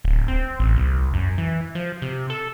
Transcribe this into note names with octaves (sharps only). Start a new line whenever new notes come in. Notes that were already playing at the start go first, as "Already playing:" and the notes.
D1
C4
A1
C2
F#2
E3
F3
C3
A4